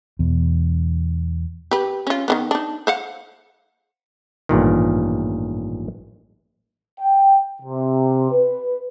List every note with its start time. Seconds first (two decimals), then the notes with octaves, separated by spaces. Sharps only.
0.19 E2 B2
1.71 G4 B4
2.07 C#4 F4
2.28 D#3 F3 B3
2.51 D4 D#4
2.87 C5 F5 F#5
4.49 A1 G2 A#2 D#3
7.00 G5
7.62 C3
8.32 B4